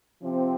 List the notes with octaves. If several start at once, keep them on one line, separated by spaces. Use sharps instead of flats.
C3 F3 C4